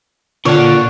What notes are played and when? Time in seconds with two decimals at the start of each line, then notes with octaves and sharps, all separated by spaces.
0.45 A#2 D3 D4 C#5 F5 F#5